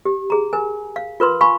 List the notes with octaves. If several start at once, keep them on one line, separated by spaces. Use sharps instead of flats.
G4
G#4 A#5
A#4 G#5
F5
F4 A#4 B4 C6
F5 G#5 B5 C#6